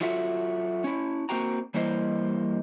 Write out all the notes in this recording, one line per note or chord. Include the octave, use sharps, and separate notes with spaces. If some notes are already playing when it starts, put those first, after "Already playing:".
F#3 F4 F#4 A4 E5
C#4 E4
A#3 C4 F#4 G5 A#5
E3 G3 A#3 E4 C5 D#5